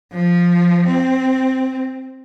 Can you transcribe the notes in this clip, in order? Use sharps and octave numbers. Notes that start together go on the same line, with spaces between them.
F3
C4